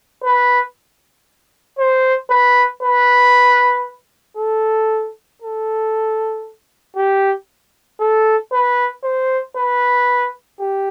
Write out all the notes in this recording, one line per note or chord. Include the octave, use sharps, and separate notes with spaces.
B4
C5
B4
B4
A4
A4
G4
A4
B4
C5
B4
G4